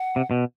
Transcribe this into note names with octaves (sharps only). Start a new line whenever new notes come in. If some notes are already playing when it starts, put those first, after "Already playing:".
Already playing: F#5
C3
B2